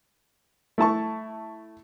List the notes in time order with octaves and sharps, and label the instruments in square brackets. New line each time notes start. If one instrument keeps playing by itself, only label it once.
[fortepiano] A3 E4 A5 C#6